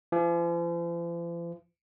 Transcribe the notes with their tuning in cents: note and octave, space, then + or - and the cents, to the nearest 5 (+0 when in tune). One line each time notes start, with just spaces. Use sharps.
F3 -45